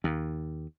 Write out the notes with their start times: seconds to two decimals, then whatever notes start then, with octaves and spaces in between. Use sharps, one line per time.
0.04 D#2